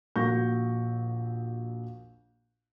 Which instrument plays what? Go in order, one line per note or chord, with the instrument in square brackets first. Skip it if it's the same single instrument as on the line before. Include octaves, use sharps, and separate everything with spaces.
[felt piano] A#1 A#2 F#4 C#6 G6 A#6